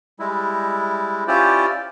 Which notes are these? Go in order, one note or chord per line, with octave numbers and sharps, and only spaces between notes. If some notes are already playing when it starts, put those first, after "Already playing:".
G3 G#3 E4
C#4 E4 F4 G4 C5 D5